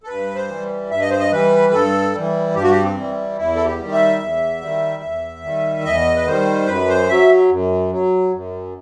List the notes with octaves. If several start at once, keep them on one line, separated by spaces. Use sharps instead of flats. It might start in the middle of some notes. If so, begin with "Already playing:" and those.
A4
G2 B4
C5
E3 G3
G2 E5
D#5
C5
D#5
E3 G3 B4
G2 A4
E3 G3
G2 G4
F#4
G4
C4
E3 G3
E2 E4
A4
G4
D#3 G3
E5
E2
D#3 G3
E2
D#3 G3
E2 D#5
B4
D#3 G3 C5
F#2 B4
C5
F#3 E5
F#2
F#3
F#2